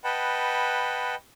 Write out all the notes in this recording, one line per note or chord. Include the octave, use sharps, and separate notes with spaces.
B4 D#5 F#5 G5 A5 B5